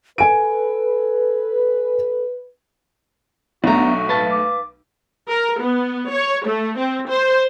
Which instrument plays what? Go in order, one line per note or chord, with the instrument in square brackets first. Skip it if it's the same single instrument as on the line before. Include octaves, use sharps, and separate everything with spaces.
[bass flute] A4 [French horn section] B4 [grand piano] G#5 D7
[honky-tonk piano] B1 A3 [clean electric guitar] B3 D4 A#5 [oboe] F#4
[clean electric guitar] B4 F5 A5
[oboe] D6
[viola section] A#4
B3
C#5
A3
C4
C5